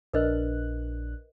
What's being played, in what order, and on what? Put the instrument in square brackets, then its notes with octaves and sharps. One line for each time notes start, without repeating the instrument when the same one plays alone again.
[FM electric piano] A#1 D4 F#6 [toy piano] A#4 B4 D#5